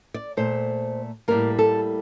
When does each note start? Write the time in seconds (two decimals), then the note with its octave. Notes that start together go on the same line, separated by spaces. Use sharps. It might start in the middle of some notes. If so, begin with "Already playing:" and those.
0.14 D5
0.37 A#2 A3 C5
1.28 A2 G3 A#3 A#4
1.59 A4